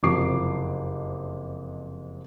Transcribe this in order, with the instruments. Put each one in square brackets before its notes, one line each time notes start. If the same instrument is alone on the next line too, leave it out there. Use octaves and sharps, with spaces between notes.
[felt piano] F#1 F2 C3 D6 C7